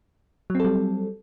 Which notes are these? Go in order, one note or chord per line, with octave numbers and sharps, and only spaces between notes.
F#3 G3 C4 A4